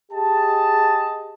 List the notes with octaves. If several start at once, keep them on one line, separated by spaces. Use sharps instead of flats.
G4 G#4 D#5 A5